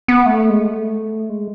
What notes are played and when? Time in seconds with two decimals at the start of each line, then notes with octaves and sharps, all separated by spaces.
0.08 B3
0.26 A3
0.50 G#3
0.61 A3
1.29 G#3